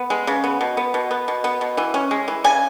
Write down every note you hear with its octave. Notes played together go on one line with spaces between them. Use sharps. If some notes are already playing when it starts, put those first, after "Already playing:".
Already playing: B3
G#3
C#3
B3
B2
B3
B2
B3
B2
B3
B2
E3
C#4
G#3
E3
C#3 G#5